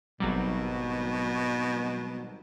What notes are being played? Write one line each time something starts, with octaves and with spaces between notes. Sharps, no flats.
G#1 B2 F#3 G3